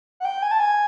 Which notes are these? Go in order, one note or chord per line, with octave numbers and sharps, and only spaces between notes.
F#5
G5
G#5
A5
G#5